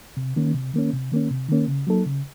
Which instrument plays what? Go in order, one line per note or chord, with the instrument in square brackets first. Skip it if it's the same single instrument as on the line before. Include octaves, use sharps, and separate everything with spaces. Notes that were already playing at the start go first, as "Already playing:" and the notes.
[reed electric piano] C3
D#3 A#3 C#4
C3
D#3 A#3 C#4
C3
D#3 A#3 C#4
C3
D#3 A#3 C#4
C#3
F#3 A#3 D#4 A4
C#3